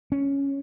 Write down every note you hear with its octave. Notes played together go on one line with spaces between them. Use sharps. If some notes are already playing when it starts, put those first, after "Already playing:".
C#4